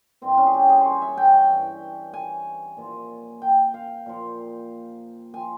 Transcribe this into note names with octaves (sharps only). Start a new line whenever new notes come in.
G2 E3 C4
C#4
G#4
G4
G#4
C5 C#5
E5
G5
G5
G2 E3
G#5
A#2 F3
G5
F5
A#2 F3
G#5
F3